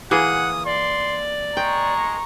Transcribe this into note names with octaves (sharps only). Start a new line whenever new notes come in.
E3 A#3 G#4 F#5 D#6
D5 C6
G#3 G5 A#5 C#6